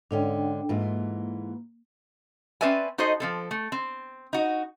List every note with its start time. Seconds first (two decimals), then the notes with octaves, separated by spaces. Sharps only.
0.11 G#2 D3 C#4 D4 G5
0.69 G#2 E3 A#3 F4
2.61 C4 C#4 B4 D5 E5 G#5
2.98 D#4 F#4 A4 C5 D#5
3.20 F3 C4 A4
3.51 A3
3.72 C4
4.33 D#4 F#4